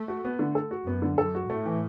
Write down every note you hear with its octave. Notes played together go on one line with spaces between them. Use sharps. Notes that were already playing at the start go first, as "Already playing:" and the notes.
Already playing: A3
F#4
B3
D3
A4
F#4
F#2 B3
D3
F#2 A4
F#4
A2 A3
E3